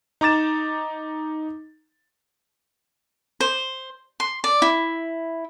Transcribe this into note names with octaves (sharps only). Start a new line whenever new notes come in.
D#4 A#5 D6 A6 E7
C5
C6
D5
E4